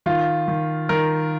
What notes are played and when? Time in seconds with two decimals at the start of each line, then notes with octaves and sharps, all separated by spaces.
0.06 D#3 F4
0.48 D#3
0.89 D#3 A#4